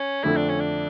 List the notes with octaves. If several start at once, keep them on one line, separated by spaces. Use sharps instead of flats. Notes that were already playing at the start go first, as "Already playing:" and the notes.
Already playing: C#4
F2 D3 A3 E4
D4
C#4
D4